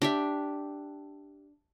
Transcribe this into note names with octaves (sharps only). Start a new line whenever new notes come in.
D4 G4 E5